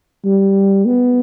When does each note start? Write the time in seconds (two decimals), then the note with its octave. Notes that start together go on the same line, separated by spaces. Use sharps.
0.25 G3
0.86 B3